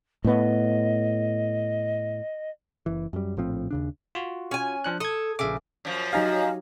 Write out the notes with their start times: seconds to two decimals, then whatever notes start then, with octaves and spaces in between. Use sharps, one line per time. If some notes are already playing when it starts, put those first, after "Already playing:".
0.24 A2 B3 D#5
2.86 F#1 E3
3.13 F#2 G3
3.37 A#1 A2 F3 C4
3.71 D#2 C#3 D4
4.15 F4 F#4
4.51 C#4 G#5
4.84 F3 D4 F#6
5.00 A4 D#6 G#6
5.39 A#1 C#3 E5 D6
5.85 F#2 F3
6.13 F#3 D#4 G4 D#5 F5 G#5 A#5